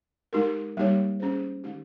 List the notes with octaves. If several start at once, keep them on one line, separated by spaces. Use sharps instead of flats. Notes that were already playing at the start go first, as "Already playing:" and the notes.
G#3 D#4 G4 A#4
G3 A#3 D#4 G4 C#5
C#4 G#4 C5
D#3 G#3 D#4 G4